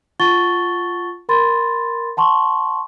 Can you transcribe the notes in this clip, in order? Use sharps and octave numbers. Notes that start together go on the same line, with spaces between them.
F4 F#5 A5 C#6 A6 G7
A#4 B5 C6 A6
F#5 A5 C6 C#6